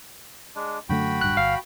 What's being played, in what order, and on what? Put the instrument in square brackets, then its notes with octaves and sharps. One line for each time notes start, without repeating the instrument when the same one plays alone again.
[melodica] G#3 D4
[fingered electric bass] F#2 D3 A3 [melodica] F#4 G5 B5
[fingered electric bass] D1 G2 [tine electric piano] F#6
[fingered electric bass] G1 [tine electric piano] F5